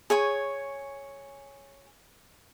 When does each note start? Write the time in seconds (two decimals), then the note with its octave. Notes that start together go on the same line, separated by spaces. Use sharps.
0.10 G#4 C#5 G#5 C#6